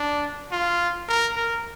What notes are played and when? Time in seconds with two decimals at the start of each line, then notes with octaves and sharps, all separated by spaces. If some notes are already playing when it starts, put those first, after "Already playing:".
Already playing: D4
0.51 F4
1.09 A#4
1.36 A#4